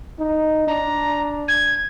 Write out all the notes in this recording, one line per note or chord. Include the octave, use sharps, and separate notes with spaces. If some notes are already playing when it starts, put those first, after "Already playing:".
D#4
D4 A#5
G#6